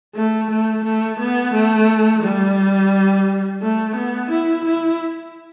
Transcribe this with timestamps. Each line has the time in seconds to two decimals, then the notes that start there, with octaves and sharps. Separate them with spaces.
0.15 A3
0.50 A3
0.84 A3
1.20 B3
1.54 A3
2.23 G3
3.62 A3
3.96 B3
4.30 E4
4.65 E4